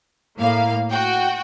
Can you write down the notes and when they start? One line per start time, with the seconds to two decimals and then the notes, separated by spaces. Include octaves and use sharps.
0.38 A2 A#3 F5
0.90 F#4 G5